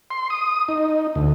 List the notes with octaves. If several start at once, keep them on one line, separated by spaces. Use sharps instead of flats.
C6
D#6
D#4
D2